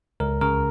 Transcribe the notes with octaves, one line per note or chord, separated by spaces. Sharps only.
C#2 A#4
C#3 A#4